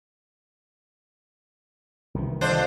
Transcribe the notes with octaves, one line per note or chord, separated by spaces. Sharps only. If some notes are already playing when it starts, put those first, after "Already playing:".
C2 D#3 E3
F2 D4 C5